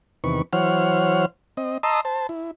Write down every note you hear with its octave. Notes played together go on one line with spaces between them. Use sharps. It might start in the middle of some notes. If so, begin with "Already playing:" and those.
E2 C3 D#3 B4 C#6
E3 F#3 C5 C#5 F#5 F6
C4 D#5
D#5 A5 A#5 C6 D#6 E6
C5 A5
E4